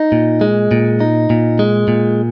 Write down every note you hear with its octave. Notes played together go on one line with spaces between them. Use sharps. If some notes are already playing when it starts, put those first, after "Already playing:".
Already playing: D#4
A#2
G#3
A#2
D#4
A#2
G#3
A#2